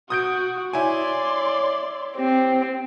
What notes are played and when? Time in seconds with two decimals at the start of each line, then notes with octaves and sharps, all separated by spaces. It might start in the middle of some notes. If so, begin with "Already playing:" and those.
0.10 F#4 D#6 G6 D7
0.73 E4 C#5 D5 G#5 C6
2.17 C4 G4